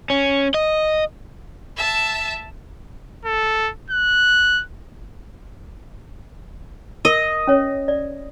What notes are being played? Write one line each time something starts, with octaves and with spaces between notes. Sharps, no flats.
C#4
D#5
E5 A5
A4
F#6
A#4 D#5
C#4 C#5
D5